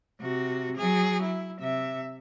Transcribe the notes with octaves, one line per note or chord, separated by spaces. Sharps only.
C3 F#4
F#3 G#4
E4
C3 E5